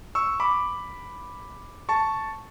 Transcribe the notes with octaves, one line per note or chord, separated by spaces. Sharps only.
C#6 E6
B5 D6
A5 C#6